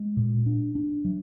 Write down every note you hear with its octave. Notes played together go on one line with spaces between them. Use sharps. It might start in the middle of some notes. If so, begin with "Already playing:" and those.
Already playing: G#3
A#2
D4
D4
F#3